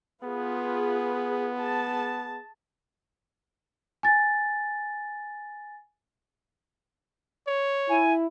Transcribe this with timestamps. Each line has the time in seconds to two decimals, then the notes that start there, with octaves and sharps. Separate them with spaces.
0.23 B3 F4 G#4 B4
1.57 G#4 A5
4.03 G#5 A6
7.47 C#5
7.89 E4 G#5